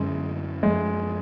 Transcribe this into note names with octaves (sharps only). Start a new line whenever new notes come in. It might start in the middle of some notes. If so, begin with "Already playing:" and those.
Already playing: F#2 D3 F#3 G#3 C#4
F#2 F3 G#3 A3